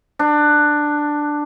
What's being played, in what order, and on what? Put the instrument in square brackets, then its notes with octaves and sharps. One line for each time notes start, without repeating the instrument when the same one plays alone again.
[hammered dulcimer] D4